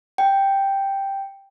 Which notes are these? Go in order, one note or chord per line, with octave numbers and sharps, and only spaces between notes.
G5